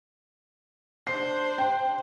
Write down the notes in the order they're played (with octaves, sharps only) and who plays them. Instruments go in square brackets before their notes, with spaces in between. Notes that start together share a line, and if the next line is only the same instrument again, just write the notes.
[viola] D4 C5 [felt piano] C7
[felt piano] G5